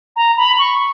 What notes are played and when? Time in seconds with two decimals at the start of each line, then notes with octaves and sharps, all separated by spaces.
0.16 A#5
0.37 B5
0.59 C#6